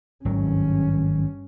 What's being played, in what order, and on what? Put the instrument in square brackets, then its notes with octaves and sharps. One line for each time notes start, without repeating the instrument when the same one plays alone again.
[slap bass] G#1 D#3 F#3 [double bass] G2 C#4